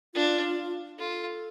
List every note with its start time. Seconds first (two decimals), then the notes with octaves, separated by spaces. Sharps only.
0.14 D4 F4
0.99 F4 A4